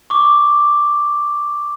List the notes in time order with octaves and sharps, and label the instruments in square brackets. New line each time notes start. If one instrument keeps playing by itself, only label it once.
[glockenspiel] C#6 D6